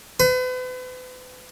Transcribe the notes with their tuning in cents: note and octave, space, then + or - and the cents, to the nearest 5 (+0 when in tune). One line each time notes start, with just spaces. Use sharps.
B4 +40